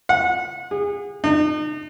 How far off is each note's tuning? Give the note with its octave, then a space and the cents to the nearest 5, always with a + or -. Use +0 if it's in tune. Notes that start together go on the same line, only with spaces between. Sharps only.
F#5 -25
G#4 -35
D#4 -40